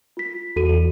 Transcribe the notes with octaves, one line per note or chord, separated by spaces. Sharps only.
F4 B6
E2 F#4 A4 D#7